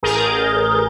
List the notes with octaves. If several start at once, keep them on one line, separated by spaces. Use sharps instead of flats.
A1 G#4 A#4 A#5 G6 A6